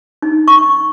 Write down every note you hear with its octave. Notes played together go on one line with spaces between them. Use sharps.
D#4
C#6